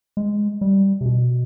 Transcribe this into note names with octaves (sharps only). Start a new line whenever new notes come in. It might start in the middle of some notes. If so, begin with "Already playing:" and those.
G#3
G3
C3
B2